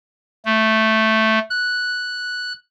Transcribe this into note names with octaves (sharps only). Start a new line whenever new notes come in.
A3
F#6